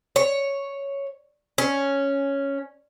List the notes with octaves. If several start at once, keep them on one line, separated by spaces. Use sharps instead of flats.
C#5
C#4